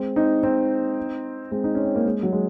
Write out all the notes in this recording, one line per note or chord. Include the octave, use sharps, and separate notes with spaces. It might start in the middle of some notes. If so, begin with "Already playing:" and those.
Already playing: G#3 C4
C4 D#4
C4 D#4
G#3 C4
D#4
C#4
C4
A#3
G#3
F#3
G#3